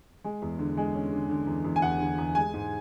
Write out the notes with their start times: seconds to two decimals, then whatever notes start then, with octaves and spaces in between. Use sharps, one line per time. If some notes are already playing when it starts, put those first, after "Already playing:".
0.24 G#3
0.42 E2
0.59 D3
0.77 G#3
0.95 C#4
1.13 D3
1.29 D3
1.47 E2
1.64 E2
1.76 G#5
1.82 E2 F#5
2.00 D3
2.18 E2
2.35 G#3 G#5
2.54 G#2